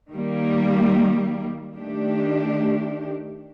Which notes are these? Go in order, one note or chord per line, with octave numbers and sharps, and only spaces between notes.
D#3 G3 A#3
D#3 A3 D4 G4